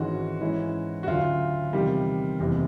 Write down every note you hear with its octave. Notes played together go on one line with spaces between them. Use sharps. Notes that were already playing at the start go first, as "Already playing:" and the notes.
Already playing: G#1 G#2 E3 G#3 C#4 F#4
G#2 E3 G#3 C#4 E4
F#4
D2 C#3 F#3 F4
E2 C3 D#3 G3
F#1 E2 C3